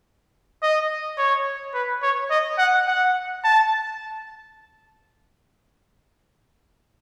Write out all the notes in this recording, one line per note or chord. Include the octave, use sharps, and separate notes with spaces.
D#5
C#5
B4
C#5
D#5
F#5
F#5
A5